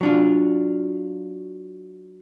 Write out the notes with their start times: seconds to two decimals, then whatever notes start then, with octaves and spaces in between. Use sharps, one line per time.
0.01 F#3 D4 F4